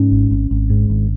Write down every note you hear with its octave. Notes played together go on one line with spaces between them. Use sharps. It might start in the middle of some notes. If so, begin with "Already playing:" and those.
Already playing: G#2 C#4
G#1
G#1
G#1
G#2
G#1